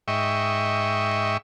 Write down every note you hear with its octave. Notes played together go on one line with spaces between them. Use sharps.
G#2 D#5 E5 G5 C#6